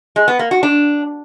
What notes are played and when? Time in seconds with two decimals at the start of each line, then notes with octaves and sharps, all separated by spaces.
0.16 G#3
0.28 B3
0.39 A#3
0.51 F#4
0.63 D4